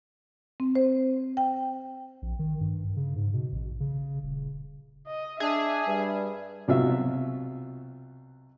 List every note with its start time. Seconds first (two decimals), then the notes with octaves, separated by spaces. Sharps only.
0.60 C4
0.75 C5
1.37 G5
2.22 A#1
2.39 D#3
2.61 G2
2.97 C#3
3.16 G#2
3.33 B2
3.52 A1
3.80 C#3
4.23 D#1
5.07 D#5
5.40 D4 G#4 E5
5.87 G2 G3
6.68 C2 B2 F#3 F4 F#4 E5